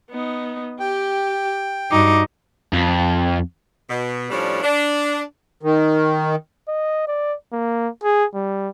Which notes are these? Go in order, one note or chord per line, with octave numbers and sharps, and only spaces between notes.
B3 D#4
G4 G5
G2 D#4 F#4 D6
F2
B2
A2 F3 G3 C#4 D4
D4
D#3
D#5
D5
A#3
G#4
G3